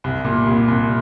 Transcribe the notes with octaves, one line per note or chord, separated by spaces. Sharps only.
C2
A#2
C2
C2